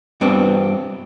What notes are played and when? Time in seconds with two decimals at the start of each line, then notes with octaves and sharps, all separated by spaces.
0.21 G2 B3 C4 D4